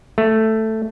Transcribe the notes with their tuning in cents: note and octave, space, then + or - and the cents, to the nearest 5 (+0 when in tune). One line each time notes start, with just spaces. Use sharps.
A3 +5